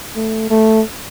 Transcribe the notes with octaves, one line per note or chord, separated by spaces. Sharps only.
A3
A3